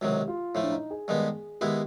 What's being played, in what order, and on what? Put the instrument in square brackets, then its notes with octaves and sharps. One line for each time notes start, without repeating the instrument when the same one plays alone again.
[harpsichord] C#2 C3 D#3 F#3 [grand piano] G4
[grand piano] F4
[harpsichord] A2 F3 A3 [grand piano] E4
[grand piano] D4
D#4
G#4
[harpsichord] G2 D#3 G#3 B3
[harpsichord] D#3 G#3 B3 E4 [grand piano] G4